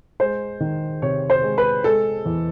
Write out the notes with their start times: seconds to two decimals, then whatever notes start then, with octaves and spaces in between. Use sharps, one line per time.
0.20 G#3 C5
0.60 D#3
1.02 C3 C#5
1.30 C5
1.43 G#3
1.58 B4
1.84 G#3 A4
2.26 E2